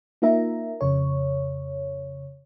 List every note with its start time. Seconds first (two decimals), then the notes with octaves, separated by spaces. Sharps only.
0.22 A#3 D#4 F4 A#4 E5 A#5
0.81 F2 C#3 C#5